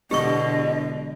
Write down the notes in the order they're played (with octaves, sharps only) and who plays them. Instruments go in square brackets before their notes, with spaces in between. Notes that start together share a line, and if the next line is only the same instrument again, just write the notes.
[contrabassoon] E1 [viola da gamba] B2 D3 [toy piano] G4 C#6 [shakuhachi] D#5